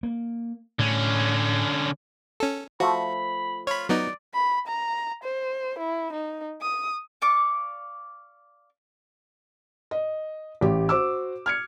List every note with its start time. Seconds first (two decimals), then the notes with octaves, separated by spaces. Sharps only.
0.03 A#3
0.79 A2 D3 C#4
2.40 C#4 A4
2.80 F3 A3 F#4 B5
3.67 F4 C#5 B5
3.89 F#3 B3 D#4 D5
4.34 B5
4.67 A#5
5.24 C5
5.79 E4
6.13 D#4
6.61 D#6
7.22 D5 F5 C#6 D6
9.91 D#5
10.61 A1 G4
10.89 F#4 C5 D6 E6
11.46 F6 G#6 C#7